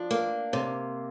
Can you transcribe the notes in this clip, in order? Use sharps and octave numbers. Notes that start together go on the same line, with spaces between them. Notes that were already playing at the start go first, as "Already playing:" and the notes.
Already playing: F3 D4
A#3
C3